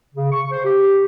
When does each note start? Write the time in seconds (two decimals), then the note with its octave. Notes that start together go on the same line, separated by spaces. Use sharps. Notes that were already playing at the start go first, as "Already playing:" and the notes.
0.15 C#3
0.32 C#6
0.51 C5
0.64 G4